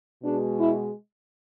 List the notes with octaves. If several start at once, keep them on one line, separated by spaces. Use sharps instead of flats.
B2 G#3 D4
E4